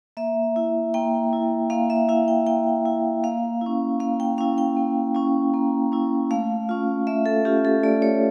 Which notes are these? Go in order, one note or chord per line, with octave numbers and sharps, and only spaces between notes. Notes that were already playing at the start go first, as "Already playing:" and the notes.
A#3 E5
E4
A#3 G5
E4
A#3 F5
E5
E4 F5
G5
A#3 G5
E4
A#3 F5
C#4 E4
A#3 F5
G5
C#4 E4 F5
G5
A#3
C#4 E4
A#3
C#4 E4
A3 F5
C#4 F4
A3 E5
A4
C#4 F4 G4
A4
A3 D5
C#5